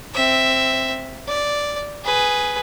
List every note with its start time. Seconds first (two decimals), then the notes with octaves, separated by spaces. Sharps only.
0.14 C4 E5
1.28 D5
2.04 G#4 B4